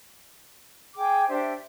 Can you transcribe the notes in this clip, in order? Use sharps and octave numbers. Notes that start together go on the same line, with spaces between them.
G#4 G5 D6
D4 G4 C5 E5